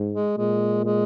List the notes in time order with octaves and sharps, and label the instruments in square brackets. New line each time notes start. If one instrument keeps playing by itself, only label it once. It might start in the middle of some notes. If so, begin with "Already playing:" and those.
Already playing: [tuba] G#2
[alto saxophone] G#3
[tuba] A#2 [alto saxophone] G#3
[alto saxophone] G#3